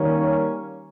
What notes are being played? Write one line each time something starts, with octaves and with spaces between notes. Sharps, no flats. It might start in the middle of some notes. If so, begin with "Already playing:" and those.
Already playing: D#3 G3 A#3 C#4